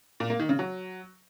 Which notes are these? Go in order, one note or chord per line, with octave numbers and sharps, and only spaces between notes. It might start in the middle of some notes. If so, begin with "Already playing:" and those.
A#2
A#3
D#3
C#3
F#3